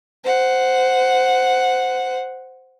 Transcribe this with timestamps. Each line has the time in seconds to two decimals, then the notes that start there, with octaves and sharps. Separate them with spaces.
0.24 C5 F#5